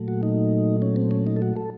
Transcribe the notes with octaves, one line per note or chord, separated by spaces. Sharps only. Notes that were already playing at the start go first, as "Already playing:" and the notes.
Already playing: A#2 F#3 A3
F#4
D#4
C#4
C4
C#4
D#4
A4
F#4
A4